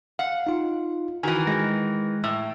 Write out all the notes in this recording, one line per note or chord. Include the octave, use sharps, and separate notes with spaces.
F5 F#5
D#4 F4
D#3 E3 F#4 G#5
G#3 A#6
A2